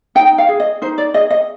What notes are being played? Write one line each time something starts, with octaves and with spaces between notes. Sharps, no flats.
D#4 G5
F5
G#4
D#5
D#4 C5
D5
G#4 D#5
D#5